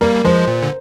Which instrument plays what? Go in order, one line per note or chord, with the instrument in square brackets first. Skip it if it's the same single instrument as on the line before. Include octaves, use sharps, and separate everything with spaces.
[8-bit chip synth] G3 A#3 [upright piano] A#4
[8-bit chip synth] F3 G#3 [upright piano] C5
[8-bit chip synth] A#2
D3